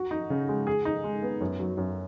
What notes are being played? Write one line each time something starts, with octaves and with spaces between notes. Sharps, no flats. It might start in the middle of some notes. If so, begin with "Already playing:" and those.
Already playing: F#4
D#4
C#3
G#3
G#4
D#4
G#3
B3
F#2
F#3
F#2